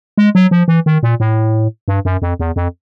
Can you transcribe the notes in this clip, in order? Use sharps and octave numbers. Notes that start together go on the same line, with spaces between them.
G#3
F#3
F3
E3
D#3
A#2
A2
G2
F#2
F2
E2
F2